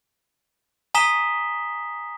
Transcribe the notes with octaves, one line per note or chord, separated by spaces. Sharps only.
G#5 A#5 D#6 B6 E7 G7